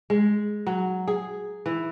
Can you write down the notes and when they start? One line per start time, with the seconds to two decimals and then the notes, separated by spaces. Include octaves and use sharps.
0.10 G#3
0.67 F#3
1.08 G#4
1.66 E3